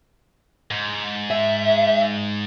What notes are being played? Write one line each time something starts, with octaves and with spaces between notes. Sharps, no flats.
G#2
E5